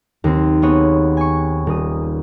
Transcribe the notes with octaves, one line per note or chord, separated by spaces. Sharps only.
D#2 C4
B3 C4 G#4 C#5 F#5
G#5 C#6
D#1 D#6